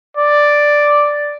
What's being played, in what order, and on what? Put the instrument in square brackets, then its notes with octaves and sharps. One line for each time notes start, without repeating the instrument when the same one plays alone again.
[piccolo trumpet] D5